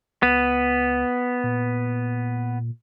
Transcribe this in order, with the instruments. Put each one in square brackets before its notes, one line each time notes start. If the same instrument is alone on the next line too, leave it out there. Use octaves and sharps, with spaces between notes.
[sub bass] C#2 [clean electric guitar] B3
[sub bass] A#2